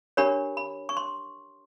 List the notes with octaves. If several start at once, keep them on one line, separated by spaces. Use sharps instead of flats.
D4 G4 A#4 C#5 B5
B5
C#6
C6